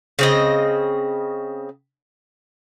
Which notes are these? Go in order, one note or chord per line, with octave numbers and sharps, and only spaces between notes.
C#3 C4 D#5